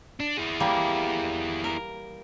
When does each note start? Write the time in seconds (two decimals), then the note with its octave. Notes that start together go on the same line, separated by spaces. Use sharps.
0.20 D4
0.37 E4 G#4
0.60 E3 G3 A#3
1.64 A#4